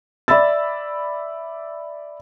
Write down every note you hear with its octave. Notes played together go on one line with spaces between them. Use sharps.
D5 E5 B5 E6 A6